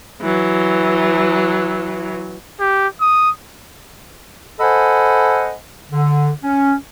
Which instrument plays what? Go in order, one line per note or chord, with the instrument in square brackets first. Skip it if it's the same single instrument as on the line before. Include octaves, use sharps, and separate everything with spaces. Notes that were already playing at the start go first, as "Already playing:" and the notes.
[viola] E3 F#3
[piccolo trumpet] G4
D#6
[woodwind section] A4 C5 D#5 F#5 G#5 B5
D3
C#4